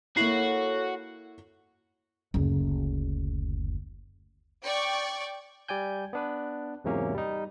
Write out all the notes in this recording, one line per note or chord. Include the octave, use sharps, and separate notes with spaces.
A#3 E4 F#4 A4 C#5 C7 F#7
F#1 D2
D5 G5 C#6
G3 D5 G5 G#5 G6
B3 D4 B4
E2 G#2 C3 F#3 A#3 C#4
G3 D#4